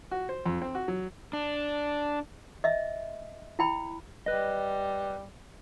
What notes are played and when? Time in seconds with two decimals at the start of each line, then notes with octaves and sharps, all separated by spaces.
0.11 F#4
0.29 C5
0.46 F2
0.62 C4
0.75 F#4
0.88 F#3
1.33 D4
2.64 D#5 E5
3.59 E4 G5 B5
4.26 G3 B4 D#5